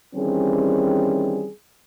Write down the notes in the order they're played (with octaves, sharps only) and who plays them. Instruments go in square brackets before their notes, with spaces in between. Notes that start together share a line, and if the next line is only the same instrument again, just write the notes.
[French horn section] D#3 E3 G3 C4 C#4 G#4